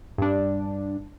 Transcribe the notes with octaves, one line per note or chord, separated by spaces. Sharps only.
G2 D4